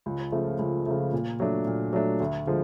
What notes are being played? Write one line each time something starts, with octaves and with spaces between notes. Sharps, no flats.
C#2
C#3 F3 A3
C#2
C#3 F3 A3
A#2
F#3 A3 D4
A#2
F#3 A3 D4
D2
D3 F3 G#3